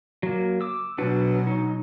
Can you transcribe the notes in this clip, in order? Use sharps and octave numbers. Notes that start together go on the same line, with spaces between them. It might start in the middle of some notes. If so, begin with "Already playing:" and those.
F#3 A#3
D6 E6
B2 F#3 D4 F#4 B4
D#4